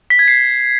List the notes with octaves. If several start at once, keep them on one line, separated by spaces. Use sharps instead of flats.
B6
G#6
C7